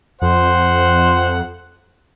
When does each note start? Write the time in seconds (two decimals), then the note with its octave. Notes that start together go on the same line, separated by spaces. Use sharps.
0.22 F2 C5 F#5